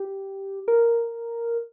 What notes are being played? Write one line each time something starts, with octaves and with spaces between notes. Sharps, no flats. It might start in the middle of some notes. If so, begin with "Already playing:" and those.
Already playing: G4
A#4